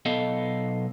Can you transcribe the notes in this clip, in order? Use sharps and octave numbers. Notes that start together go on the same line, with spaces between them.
B1 B3 A4 D#5 F5 A5